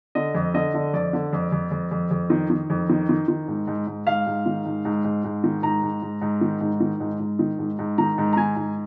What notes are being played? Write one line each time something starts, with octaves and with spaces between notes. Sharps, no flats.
D3 D#5
F2
D3 D#5
D3
F2 D5
D3
F2
F2
F2
F2
F2
D#3
D#3
F2
D#3
D#3
D#3
G#2
G#2
G#2
G#2 F5
G#2
D#3
G#2
G#2
G#2
G#2
D#3
G#2 A#5
G#2
G#2
G#2
D#3
G#2
D#3
G#2
G#2
D#3
G#2
G#2
D#3 A#5
G#2
A#5
D#3 G#5
G#2